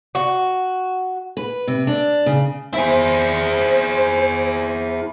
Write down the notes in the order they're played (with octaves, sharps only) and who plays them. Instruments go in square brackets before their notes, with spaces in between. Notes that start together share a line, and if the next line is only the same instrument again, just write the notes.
[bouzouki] F#4
[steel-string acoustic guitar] B4
C3
D4
C#3
[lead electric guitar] E4 G#4 [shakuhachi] C5